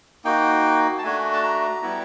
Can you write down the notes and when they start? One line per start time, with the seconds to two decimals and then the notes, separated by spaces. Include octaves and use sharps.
0.24 A#3 D#4 F#4 G5
0.98 A5
1.03 A3 D4 F#4 G#5
1.33 A5
1.43 A#5
1.82 G3 B3 E4